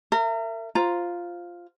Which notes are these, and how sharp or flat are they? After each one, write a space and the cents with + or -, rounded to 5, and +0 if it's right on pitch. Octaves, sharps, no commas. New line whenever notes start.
A#4 -35 E5 +25
F4 +0 C5 +0 A#5 +0